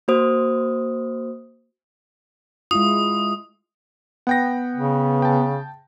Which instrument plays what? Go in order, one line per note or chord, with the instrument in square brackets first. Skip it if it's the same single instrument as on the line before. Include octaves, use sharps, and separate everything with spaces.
[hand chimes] A#3 F#4 C5 D#6
[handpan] G#3 E4 F4 [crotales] D#6
[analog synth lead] B3 [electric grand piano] F#5 G5 A#6
[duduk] C#3
[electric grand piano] G5 A5